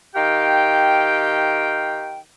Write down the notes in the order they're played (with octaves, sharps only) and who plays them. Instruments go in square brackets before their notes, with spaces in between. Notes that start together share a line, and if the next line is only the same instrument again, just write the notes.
[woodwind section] D#3 G4 F5 G5